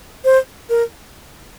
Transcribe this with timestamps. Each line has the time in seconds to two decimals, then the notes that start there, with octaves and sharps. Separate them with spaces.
0.25 C5
0.69 A#4